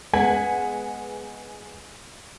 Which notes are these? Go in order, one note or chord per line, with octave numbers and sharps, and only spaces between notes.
G#3 B3 F#5 G#5 G#6 B6